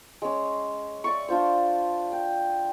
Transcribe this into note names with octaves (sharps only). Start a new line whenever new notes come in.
G#3 C#4
D5 E5 C#6
D4 F4 C5
G5